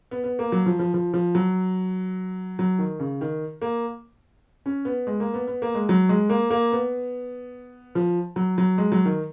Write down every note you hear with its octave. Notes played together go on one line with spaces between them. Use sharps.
B3
B3
A#3
F#3
F3
F3
F3
F3
F#3
F#3
D#3
C#3
D#3
A#3
C#4
B3
G#3
A#3
B3
B3
A#3
G#3
F#3
G#3
A#3
A#3
B3
F3
F#3
F#3
G#3
F#3
D#3